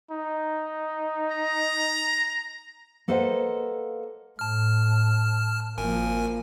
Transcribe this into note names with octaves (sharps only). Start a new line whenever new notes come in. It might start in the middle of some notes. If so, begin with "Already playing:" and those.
D#4
A#5
A#3 A4 B4 C5 D#5 F#5
A2 A5 F6
G#1 F3 A#3 A#4 G#5